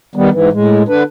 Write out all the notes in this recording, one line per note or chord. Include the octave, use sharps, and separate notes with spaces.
D#3 G3 B3
G#2 E3
A2 G#3
D3 D4 B4